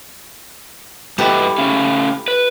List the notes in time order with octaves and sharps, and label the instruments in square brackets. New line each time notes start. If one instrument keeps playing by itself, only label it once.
[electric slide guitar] G2 B4 D#5 [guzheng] E4 G4 A4
[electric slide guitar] A3 C#4 F5
B4